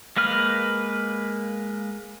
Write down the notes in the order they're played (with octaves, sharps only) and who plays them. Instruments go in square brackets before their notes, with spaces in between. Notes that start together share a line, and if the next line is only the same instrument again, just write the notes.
[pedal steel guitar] G#3 A#3 B4 F6